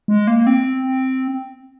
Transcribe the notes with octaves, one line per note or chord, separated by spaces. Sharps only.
G#3
A#3
C4